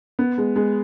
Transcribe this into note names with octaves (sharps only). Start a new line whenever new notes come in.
B3
G#3
G#3